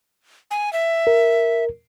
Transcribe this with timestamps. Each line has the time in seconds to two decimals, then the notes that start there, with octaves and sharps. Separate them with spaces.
0.51 G#5
0.73 E5
1.07 A#4